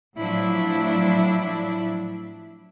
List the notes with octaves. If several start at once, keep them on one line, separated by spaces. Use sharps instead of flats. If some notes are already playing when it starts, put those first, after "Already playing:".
A2 F3 F#3 D4 E4